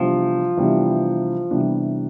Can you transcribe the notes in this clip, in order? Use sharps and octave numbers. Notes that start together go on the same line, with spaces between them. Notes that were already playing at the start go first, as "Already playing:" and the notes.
Already playing: C3 E3 F3 G3 B3 D4
C3 E3 G3 B3 D4
C3 E3 G3 B3 D4